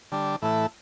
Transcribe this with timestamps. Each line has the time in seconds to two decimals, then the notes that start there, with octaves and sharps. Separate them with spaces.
0.12 D3 G3 D4
0.42 A2 E3 A3 E4